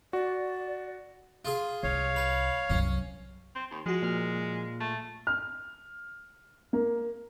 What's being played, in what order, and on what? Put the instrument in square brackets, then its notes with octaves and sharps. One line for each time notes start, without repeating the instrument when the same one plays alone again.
[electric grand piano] F#4 [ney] D5
[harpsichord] F4 G#4
[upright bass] C2 [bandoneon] C#5 F5
[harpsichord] B4
[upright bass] C2 F#2 [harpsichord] C#4
[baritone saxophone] C4
D#2
[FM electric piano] F3 F#4 [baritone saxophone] G#3
[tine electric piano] A#2 F6
[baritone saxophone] A3
[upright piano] F6
A#3